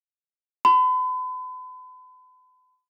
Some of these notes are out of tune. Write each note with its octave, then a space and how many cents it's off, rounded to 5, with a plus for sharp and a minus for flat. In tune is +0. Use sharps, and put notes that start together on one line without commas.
B5 +40